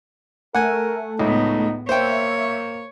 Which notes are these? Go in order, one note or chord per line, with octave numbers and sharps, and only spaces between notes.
A3 A#4 F#5 G#5
C#2 A2 B3 D#4
A#3 C5 C#5 E5 G5